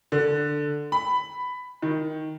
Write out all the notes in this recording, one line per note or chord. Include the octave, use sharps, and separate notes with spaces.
D3
B5
D#3